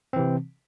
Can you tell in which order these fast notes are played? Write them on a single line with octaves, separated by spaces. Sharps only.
C4 E3 C3